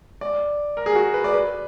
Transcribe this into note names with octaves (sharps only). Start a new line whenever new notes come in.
D5
A#4
G#4
F#4
B4
D5
B4